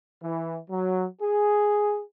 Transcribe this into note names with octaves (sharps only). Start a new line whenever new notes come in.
E3
F#3
G#4